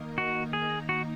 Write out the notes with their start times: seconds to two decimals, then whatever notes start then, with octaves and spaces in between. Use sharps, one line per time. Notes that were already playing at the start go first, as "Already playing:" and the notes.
Already playing: D#3 A#3 D#4 A#4
0.18 F#4
0.53 G#4
0.89 F#4